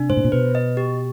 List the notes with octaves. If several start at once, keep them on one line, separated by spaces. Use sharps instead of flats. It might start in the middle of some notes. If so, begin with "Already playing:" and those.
Already playing: C3 D4
G#2 C5
A2
A#2
B2 B4
D#5
G4